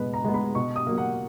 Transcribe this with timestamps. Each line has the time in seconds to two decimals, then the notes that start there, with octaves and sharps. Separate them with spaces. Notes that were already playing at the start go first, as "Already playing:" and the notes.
Already playing: B2 G#3 B3 B4
0.14 A#5
0.24 G#3 B3
0.34 B5
0.55 B2 C#6
0.76 D#6
0.87 F#3 A#3
0.98 F#5